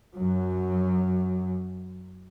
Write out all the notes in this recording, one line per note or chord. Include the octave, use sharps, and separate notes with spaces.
F#2 F#3